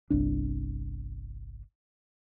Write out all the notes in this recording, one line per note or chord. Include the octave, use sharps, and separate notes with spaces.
G1 C2 D4